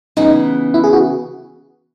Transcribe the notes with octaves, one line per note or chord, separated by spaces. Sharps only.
C#3 E3 B3 D#4
E4
G#4
F#4